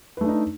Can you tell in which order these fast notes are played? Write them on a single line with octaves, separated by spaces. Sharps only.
B4 A3 D4 D#4